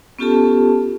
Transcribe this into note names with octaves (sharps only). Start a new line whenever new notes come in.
B3 C#4 F4 G4 A4 A5